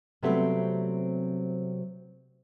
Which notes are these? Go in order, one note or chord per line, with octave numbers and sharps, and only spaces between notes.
C3 F#3 G3 A3 B3 C4